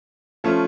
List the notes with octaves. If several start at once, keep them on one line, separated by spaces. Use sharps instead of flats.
F3 A3 C#4 F4